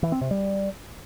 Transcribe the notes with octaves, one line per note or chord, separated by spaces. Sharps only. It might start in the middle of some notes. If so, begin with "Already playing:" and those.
E3
C4
C3
G3